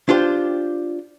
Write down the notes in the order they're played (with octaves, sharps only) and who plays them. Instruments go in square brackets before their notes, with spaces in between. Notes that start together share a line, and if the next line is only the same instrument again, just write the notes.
[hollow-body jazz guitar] D4 F4 G4 C5